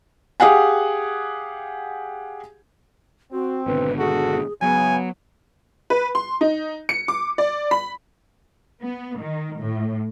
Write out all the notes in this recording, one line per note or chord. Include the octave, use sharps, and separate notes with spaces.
G4 G#4 F5 F#5 G#5
C4 F#4
G#1 B2 D3 B4
F#4 G#4 A4
G#2 C#3 F#3 B3 G#5
B4
C6
D#4
C#7
D6
D5
B5
B3
D#3
A2